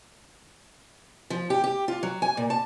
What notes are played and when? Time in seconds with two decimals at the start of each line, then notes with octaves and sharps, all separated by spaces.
1.30 F3
1.50 G4
1.64 G4
1.88 F4
2.03 F#3
2.22 G#5
2.37 A#2
2.50 A5